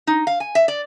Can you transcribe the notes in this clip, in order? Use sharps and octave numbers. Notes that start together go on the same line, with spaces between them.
D#4
F5
G#5
E5
D5